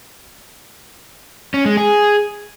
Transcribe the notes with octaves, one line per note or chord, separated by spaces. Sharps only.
C#4
G#3
G#4